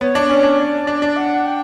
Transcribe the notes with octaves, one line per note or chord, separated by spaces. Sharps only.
B3 C#5
D4
C#4
D4
D5
D4
D4
F#5
G5